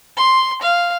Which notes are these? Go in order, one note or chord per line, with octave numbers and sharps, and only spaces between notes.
C6
F5